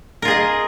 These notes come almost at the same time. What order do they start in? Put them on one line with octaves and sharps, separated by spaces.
A#4 F4 G#4 D#5